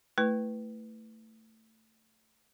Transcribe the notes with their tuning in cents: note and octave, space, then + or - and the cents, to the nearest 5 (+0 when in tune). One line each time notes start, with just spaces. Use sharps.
A3 +20 E4 +0 B4 +5